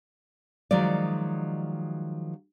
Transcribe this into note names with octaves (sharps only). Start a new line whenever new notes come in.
D#3 F3 F#3 G#3 D5